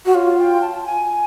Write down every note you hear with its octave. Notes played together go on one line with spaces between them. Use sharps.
F#4
F4 C#5
G5
A5
A5
G#5